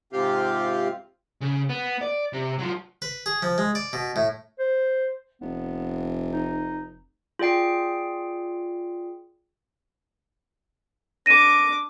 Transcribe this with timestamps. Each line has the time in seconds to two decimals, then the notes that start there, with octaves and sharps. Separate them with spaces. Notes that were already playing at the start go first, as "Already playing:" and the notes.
0.13 G#2 C3 C4 F4 G4 F5
1.41 C#3
1.69 B3
2.01 D5
2.33 C3
2.59 F#3 F4
3.02 B4
3.26 G#4
3.42 F3
3.58 G#3
3.75 D5
3.93 B2
4.16 A2
4.59 C5
5.41 F1 B3
6.33 D#4
7.39 F4 G#4 D5 G5 C7
11.26 D4 D6 A#6 D#7